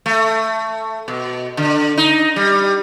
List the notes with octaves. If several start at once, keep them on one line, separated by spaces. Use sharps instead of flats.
A3
B2
D3
D#4
G3